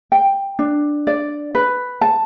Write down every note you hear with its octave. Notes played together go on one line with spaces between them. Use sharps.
G5
D4
D5
B4
A5